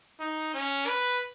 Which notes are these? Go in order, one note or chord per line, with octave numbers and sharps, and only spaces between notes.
D#4
C#4
B4